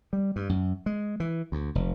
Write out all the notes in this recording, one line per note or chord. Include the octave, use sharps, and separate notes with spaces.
G3
G2
F#2
G#3
E3
D2
F1